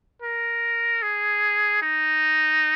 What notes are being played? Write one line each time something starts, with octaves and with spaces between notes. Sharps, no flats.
A#4
G#4
D#4